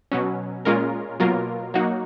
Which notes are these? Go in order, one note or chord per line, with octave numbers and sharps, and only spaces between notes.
B2 F#3 C#4
A#2 G#3 C#4 F4 A#4
B2 F#3 A#3 F4 A#4
F#3 A#3 D#4 F#4